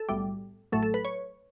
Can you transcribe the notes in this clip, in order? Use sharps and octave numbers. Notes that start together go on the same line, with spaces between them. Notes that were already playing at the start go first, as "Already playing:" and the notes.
Already playing: A4
B1 A2 G3
A1 A2 F#3 A3 A4
A4
B4
C#5